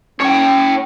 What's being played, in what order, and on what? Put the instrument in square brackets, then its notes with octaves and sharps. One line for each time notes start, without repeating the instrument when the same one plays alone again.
[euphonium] C#4 [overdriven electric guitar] C#5 G5